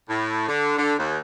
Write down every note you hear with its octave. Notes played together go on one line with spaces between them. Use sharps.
A2
D3
D3
D#2